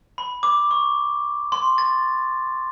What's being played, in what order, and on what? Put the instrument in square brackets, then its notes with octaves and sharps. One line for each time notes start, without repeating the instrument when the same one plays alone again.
[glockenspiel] B5
D6
C#6
C6
A6